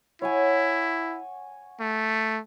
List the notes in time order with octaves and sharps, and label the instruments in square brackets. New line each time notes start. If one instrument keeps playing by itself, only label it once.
[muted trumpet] E4 [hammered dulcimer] C#5 F#5 G#5
[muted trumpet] A3